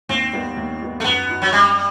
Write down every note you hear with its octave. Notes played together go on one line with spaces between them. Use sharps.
D#2 C4
D#3 G3 B3
D#2
D#3 G3 B3
A3
F#2 B3
D#3 F#3
F#3
F#2 G3